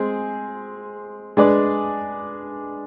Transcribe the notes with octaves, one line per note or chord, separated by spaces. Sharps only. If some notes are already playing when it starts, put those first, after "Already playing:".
Already playing: G#3 C4 G#4
G#3 D4 G#4 B4 D5